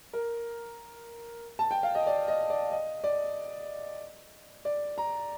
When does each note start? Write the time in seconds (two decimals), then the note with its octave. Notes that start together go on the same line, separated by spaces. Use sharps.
0.13 A#4
1.59 A5
1.71 G5
1.83 F5
1.95 D#5
2.07 D5
2.28 D#5
2.50 D5
2.72 D#5
3.04 D5
4.65 D5
4.98 A#5